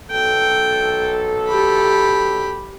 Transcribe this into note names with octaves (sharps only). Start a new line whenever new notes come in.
B1 A4 G5
G4 B5